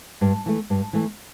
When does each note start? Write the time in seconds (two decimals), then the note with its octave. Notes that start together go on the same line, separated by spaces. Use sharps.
0.21 G2
0.46 E3 A3
0.70 G2
0.93 E3 A3